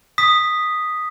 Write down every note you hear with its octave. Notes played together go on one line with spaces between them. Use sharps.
D#6 B6